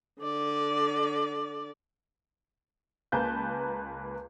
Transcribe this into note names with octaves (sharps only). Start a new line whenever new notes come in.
D3 D5
C#2 A#3 B4 G#5 A5 G6